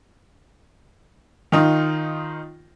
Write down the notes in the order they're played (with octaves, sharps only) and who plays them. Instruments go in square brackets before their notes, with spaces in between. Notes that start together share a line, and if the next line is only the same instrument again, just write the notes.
[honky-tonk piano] D#3 D#4 F4